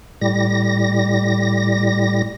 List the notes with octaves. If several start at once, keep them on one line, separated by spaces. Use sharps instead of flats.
A2 G3 A#6